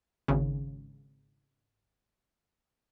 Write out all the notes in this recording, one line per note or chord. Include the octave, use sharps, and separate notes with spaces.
G#1 C#3